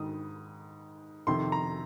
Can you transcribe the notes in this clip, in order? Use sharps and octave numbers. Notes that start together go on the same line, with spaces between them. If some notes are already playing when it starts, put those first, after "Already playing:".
Already playing: G#2 D#3 D#6
F2 C3 D#3 C6
A#5